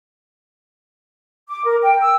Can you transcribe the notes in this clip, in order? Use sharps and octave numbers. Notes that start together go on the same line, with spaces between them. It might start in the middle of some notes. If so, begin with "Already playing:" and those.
D6
A#4
G5
E6